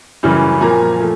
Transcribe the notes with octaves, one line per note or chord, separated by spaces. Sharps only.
F#2 C#3 E3 G3
A#2 F3 A#3 G#5 A#5
F3 A3